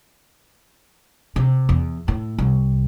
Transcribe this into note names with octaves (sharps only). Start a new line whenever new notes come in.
C3
E2
A2
C2